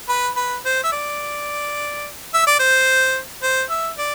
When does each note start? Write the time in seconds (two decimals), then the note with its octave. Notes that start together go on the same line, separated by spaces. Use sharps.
0.09 B4
0.36 B4
0.65 C5
0.84 E5
0.92 D5
2.34 E5
2.47 D5
2.59 C5
3.43 C5
3.70 E5
3.98 D5